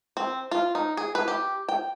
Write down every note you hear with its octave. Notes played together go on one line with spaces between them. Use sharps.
C4
F4
D#4
G#4
B4
G4
G5